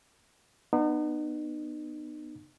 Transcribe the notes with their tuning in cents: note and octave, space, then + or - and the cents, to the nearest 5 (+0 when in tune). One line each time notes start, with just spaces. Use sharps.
B3 +0 D#4 -40